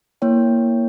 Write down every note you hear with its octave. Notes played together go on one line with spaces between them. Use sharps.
A#3 E4 C#5 G5